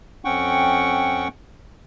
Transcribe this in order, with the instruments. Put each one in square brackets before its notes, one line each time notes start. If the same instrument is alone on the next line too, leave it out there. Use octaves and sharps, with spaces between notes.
[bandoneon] F2 C4 C#4 F#5 G5 C#6